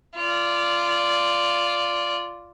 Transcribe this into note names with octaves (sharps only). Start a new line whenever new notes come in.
F4 D5